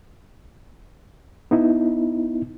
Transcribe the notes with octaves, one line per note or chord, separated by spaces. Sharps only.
B3 D#4 E4